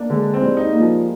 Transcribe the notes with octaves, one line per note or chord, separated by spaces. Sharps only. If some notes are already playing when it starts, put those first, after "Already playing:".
Already playing: A#3 D4
D3 G#3
C4
G3
D#4
A#3
F3